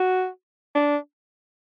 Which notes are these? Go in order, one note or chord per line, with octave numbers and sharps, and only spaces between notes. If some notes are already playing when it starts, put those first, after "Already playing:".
Already playing: F#4
D4